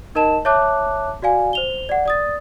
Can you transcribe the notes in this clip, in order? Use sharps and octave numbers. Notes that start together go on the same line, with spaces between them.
D#4 A#4 D#5 A5 E7
C#5 E5 A5 D6 F#6
F#4 D5 F5 G#5
C5 F7 G7
D5 F#5
D5 D#6 A6